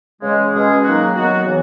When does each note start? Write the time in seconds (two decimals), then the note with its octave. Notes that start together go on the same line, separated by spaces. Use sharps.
0.21 C#3 E3 G#3
0.52 B2 G#3 C#4 G#4
0.83 D#3 F#3 A#3 D#4 F#4
1.15 D#3 F#3 B3 F#4
1.46 C#3 E3